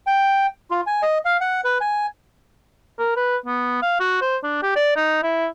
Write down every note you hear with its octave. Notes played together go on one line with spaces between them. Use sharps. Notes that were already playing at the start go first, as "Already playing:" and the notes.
G5
F4
G#5
D#5
F5
F#5
B4
G#5
A#4
B4
B3
F5
F#4
C5
D4
G4
D5
D#4
E4